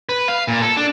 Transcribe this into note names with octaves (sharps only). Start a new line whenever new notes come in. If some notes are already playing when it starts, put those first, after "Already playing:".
B4
F5
A#2
A4
D4